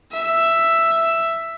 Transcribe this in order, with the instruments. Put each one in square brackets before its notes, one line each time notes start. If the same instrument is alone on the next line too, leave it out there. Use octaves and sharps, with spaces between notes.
[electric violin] E5